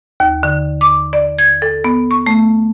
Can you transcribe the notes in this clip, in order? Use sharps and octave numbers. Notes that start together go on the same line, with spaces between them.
D#2
D3
D6
D5
G#6
A4
B3
C#6
A3